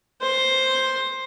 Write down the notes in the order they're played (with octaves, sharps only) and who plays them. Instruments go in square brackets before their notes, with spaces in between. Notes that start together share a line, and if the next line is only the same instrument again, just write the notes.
[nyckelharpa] C5